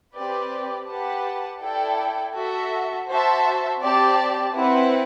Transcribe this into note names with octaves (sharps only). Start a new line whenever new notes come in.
C4 G4 B4 D5
G4 B4 F#5 A5
E4 A4 D5 G5
F#4 A4 E5
F#4 C5 E5 A5
C4 G4 D5 A5
C4 E4 B4 F#5